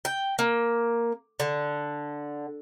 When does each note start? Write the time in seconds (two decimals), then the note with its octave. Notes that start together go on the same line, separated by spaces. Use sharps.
0.05 G5
0.39 A#3
1.40 D3